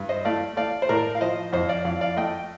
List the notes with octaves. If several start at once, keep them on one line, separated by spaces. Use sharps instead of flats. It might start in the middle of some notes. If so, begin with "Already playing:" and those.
Already playing: G2
C5 D#5
A3 D5 F5
A3 D5 F5
C5
A2 A#4 D5
F5
F3 C5 D#5
F2 C5 D#5
D5 F5
F2 D5 F5
D5 F5
A3 D#5 G5